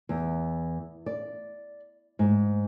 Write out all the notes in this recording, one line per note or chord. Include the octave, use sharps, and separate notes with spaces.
E2
D5
G#2